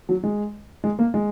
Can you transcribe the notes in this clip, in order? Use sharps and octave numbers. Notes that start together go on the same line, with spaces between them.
F#3
G#3
G#3
A#3
G#3